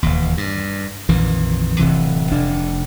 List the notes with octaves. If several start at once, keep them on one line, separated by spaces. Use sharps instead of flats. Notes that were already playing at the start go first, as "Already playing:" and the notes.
E1 D#2
G2
A#1 F2 D#3 E3
D1 C3 E3
F1 D4